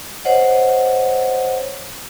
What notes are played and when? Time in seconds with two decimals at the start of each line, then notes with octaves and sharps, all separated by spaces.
0.25 C5 C#5 D#5 F#5